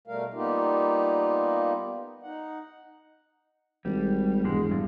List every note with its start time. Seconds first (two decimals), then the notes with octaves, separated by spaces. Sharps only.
0.07 B2 G3 A3 A#4 F5
0.33 G3 A#3 B3 D#4 F4 G4
2.23 D#4 F#5
3.85 G#1 G3
4.44 E1 G#2 G#3
4.71 G2